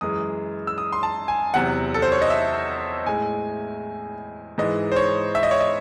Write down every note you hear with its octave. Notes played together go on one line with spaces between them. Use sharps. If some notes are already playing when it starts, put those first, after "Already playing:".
F#2 E3 G#3 D#6
E6
D#6
C6
A5
G#5
E2 C3 F#3 F#5
A4
C5
C#5
D#5
E5
A2 G#3 G#5
G#2 E3 G#3 D#5
C5
C#5
E5
D#5
C#5
D#5